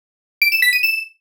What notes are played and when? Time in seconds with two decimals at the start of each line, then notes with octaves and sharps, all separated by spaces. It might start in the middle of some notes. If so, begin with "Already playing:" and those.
0.42 D7
0.52 E7
0.62 B6
0.73 D#7
0.83 E7